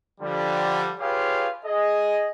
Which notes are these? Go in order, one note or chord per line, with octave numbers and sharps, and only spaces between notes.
D3 F3 G3
F4 G4 G#4 B4 C#5 F5
G#4 D#5